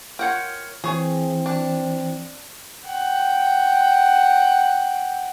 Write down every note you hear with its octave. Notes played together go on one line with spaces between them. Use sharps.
F4 A#4 C#5 F#5 G5
E3 C4 G#4 C#5
D4
F#5 G5